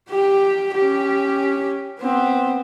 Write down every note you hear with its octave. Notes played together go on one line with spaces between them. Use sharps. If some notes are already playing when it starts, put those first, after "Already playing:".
G4 G5
C#4 G4
B3 C4